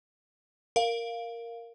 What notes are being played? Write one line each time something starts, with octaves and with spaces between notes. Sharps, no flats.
A#4 F5